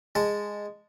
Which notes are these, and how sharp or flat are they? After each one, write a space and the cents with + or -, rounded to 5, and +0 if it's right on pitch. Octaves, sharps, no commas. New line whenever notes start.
G#3 -10 A5 +0